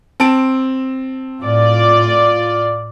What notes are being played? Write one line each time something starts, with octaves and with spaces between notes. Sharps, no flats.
C4 A5 D7
A2 F4 D5